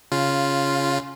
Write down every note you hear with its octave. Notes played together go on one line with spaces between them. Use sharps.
C#3 F4